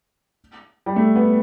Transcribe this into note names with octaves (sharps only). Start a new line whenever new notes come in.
G3
A3
B3